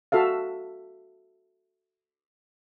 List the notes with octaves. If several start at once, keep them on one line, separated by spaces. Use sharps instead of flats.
F#4 A4 E5 F5